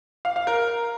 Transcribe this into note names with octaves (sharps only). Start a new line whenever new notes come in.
F5
F5
A#4